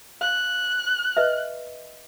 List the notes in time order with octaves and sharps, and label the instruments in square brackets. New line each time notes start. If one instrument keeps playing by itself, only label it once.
[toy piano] F5 [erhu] F#6
[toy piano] B4 D#5 E5